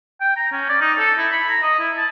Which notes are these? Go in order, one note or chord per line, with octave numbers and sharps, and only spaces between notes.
G5
A#5
C#4
D5
D#4
A4
E4
B5
A#5
D#5
E4
A5